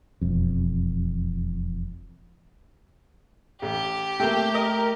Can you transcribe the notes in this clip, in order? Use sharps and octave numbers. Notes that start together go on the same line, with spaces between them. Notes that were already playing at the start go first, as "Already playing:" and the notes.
E1 F2
A1 G4
C3 A3 A#3 G5
A#4 D#5